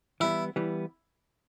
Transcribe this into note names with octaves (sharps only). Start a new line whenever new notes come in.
E3 G3 B3 E4
E3 G3 B3